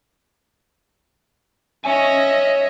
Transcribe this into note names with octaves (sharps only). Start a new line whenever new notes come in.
C#5 D#5 E5 G#5